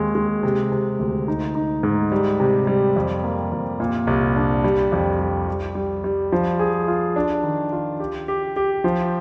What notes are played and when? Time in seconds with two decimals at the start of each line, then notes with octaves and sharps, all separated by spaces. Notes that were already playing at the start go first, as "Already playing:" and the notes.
Already playing: D#2 G#3 C4
0.15 G#3
0.43 C3
0.72 C3
0.99 D2
1.28 D#4
1.55 D#4
1.83 G#2
2.12 G3
2.40 C3
2.67 G3
2.96 F2
3.24 A#3
3.52 F2
3.80 A#2
4.07 C2
4.36 D4
4.64 G3
4.92 F2
5.19 G3
5.48 G3
5.75 G3
6.04 G3
6.32 F3
6.59 G#4
6.88 F4
7.16 D4
7.43 D#3
7.72 F4
8.00 G4
8.28 G4
8.56 G4
8.84 F3